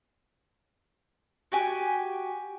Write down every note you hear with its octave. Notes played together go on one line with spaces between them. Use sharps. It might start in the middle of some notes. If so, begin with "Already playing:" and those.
F#4 G4 G#5